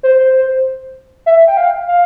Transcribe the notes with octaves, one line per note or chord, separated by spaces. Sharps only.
C5
E5
G5
F5
F5